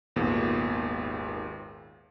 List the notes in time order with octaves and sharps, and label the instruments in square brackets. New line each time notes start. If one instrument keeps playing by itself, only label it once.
[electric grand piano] G#1 D#2 A#2 B3 G#4